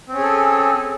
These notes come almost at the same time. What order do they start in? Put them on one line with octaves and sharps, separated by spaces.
C4 C#4 G#4 A4